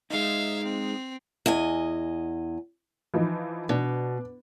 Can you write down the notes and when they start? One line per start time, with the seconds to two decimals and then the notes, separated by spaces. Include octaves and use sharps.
0.10 G#3 D#4 E5 F5
0.64 C4
1.46 E2 D#5 G#5
3.14 E3 F3 D#4
3.69 B2 D4